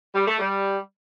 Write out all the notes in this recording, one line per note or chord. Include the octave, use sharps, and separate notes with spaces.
G3
A3
G3